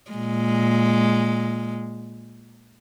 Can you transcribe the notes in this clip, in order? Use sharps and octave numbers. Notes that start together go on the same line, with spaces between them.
A#2 G#3